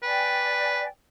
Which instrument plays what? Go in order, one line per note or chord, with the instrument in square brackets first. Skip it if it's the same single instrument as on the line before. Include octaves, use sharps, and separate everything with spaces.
[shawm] B4 [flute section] D5 G5 G#5